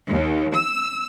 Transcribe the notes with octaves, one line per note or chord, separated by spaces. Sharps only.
D#2
E6